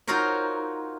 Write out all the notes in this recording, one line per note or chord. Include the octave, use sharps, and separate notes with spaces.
D#4 F4 F#4 A#4 C5 C#5